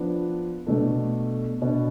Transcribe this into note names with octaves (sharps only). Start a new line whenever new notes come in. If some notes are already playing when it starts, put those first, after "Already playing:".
Already playing: F3 B3 D4
B2 A3 D4 A4
B2 B3 D4